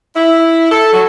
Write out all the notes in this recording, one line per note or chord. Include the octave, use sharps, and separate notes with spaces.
E4
A4
F#3